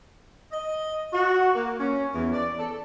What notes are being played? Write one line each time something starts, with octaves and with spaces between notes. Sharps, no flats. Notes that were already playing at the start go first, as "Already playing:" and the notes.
D#5
F#4
A#3
C#4
E2
D5
A4